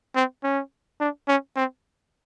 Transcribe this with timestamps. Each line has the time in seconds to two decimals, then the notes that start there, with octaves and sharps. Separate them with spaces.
0.16 C4
0.44 C#4
1.00 D4
1.28 C#4
1.56 C4